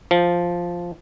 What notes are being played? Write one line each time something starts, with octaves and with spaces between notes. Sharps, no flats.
F3